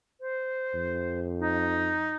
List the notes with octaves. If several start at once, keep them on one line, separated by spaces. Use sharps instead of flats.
C5
F2
D#4